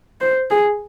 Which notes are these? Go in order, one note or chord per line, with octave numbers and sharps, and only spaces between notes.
C5
G#4